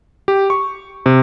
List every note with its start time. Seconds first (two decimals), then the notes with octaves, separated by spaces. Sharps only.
0.28 G4
0.50 C#6
1.06 C3